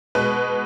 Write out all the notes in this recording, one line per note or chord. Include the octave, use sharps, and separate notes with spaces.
B2 G#3 B4